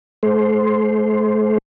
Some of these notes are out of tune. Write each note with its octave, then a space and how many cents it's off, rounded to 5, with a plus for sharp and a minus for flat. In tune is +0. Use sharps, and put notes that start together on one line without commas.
A3 -45 C5 +0